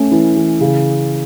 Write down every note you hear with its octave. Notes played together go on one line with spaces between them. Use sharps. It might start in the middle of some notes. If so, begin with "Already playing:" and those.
Already playing: A3 C#4
E3
E3
C#3